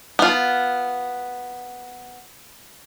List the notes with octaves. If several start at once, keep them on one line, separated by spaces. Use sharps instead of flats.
B3 F4